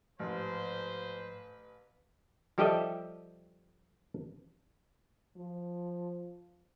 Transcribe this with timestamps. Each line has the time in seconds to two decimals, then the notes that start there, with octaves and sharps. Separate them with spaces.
0.19 A1 G#2 F3 B4 C5
2.58 F3 G3 G4 A4 D#5 E5
5.36 F3